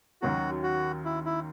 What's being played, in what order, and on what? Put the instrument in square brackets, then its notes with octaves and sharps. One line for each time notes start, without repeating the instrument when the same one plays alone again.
[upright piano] D#2 D#3 F#3 C#4 [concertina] F#4
[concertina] F#4
E4
E4